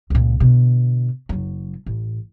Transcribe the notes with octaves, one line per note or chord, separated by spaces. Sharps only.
C#2 A#2
B2 D3
F#1 F#3
A1